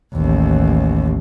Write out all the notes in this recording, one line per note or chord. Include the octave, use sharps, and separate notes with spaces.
A1 D#2